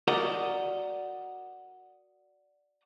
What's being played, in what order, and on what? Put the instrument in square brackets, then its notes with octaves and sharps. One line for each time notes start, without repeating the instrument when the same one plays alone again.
[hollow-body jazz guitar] F#4 A#4 D5 D#5 F#5 A#5